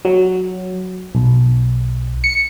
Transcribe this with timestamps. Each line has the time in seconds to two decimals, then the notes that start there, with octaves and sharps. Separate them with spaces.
0.05 F#3
1.15 B1
2.24 C#7